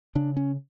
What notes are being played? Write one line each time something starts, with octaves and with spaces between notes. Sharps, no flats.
C#3 D4
C#4